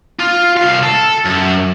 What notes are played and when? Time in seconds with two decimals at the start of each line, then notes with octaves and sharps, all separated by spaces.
0.19 F4
0.57 C2 F5
0.83 A4
1.25 F#2